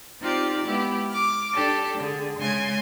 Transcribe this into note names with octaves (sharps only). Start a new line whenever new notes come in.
C4 D#4 F4 G4 D5
G#3 B3 E4 G4
D6 F6
D4 G4 A4
D3 G#4
C#3 G#3 G#5 C6 G#6